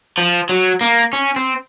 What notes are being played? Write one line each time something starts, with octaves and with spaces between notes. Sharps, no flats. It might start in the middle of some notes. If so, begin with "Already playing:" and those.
F3
F#3
A#3
C#4
C4